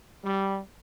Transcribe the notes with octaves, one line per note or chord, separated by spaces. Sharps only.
G3